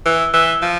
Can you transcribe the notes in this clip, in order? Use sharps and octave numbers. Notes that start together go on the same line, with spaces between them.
E3
E3
F3